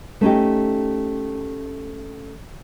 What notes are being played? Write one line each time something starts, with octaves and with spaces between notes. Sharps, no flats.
A3 C#4 D#4 G4